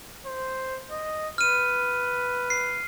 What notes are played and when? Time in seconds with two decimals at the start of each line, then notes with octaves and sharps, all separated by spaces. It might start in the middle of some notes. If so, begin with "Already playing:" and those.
0.26 C5
0.91 D#5
1.38 B4 F6 D#7
2.50 C7